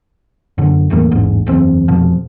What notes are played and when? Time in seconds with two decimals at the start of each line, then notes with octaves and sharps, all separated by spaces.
0.58 F#2 D3
0.90 E1 E2 A2 A#3
1.11 A1 E2 G#2
1.46 F#1 E2 C4
1.88 F1 F2 B2 F3